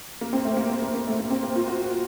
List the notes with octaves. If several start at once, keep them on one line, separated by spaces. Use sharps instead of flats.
A#3
C4
A3
A#3
A#3
A#3
A#3
A3
A#3
C4
A#3
F4
F#4
F#4